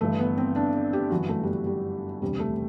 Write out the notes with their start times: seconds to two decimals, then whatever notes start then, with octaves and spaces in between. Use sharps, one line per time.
0.01 G1 G2 E3 A3
0.19 B3
0.38 C4
0.56 D4
0.93 G4
1.11 G1 F#2 E3 F#4
1.29 A3
1.43 G3
1.48 A3
1.66 G3
2.22 E1 D2 C3 G3
2.40 A3